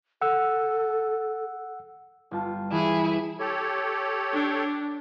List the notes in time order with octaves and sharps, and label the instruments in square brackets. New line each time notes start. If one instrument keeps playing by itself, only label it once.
[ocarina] A4 [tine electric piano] F#5 E6
[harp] G1 F4 A5
[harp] E3 [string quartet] E4 G#4
[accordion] G4 A4 C#5
[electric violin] D4